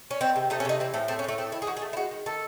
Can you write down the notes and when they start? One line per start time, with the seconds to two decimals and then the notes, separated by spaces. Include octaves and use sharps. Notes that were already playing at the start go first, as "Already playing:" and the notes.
0.11 C#4
0.21 D#3 C4
0.36 C3
0.50 A3 D#4
0.60 C#4
0.65 C3 D#4
0.80 E3 C4
0.94 A2 A3
1.08 A3 C4
1.19 C#4
1.24 A2 A3
1.38 A3 C4
1.52 D#3 E4
1.62 G#4
1.67 D#3 F#4
1.77 G#4
1.81 A3
1.93 E4
1.97 G#3 F#4
2.11 D#3
2.26 D#3 A4